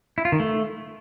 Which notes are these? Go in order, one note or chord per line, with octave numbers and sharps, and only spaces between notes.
E4
F4
D#3
A3